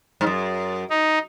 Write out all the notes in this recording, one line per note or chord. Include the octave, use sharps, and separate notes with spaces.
G#2
F#2
D#4